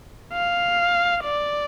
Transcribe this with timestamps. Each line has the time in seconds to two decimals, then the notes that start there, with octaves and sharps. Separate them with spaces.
0.33 F5
1.24 D5